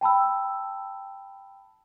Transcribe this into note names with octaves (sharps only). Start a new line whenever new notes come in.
G5 A5 B5 E6